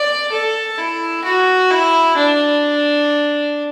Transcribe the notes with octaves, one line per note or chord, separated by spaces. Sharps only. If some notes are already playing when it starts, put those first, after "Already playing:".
Already playing: D5
A4
E4
F#4
E4
D4